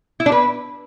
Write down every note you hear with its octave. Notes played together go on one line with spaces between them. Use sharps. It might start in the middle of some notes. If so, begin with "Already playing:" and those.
E4
D4
B4